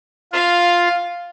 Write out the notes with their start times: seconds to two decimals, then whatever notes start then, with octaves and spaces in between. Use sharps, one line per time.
0.32 F4 F5